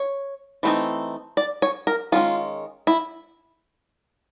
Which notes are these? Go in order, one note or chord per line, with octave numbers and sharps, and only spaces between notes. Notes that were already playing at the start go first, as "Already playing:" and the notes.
Already playing: C#5
E3 A3 C4 D#4
D5
C#5
A#4
D#3 G#3 C#4 F4
E4